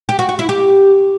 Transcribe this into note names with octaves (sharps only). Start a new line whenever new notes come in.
G4
F#4
F#4
E4
G4